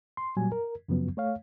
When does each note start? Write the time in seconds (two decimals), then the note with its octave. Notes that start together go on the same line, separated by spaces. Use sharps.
0.17 C6
0.37 A#2 F#3 G3 G#5
0.52 A#4
0.89 F#2 C#3 F3 F#3 B3
1.17 A3 C#5 F5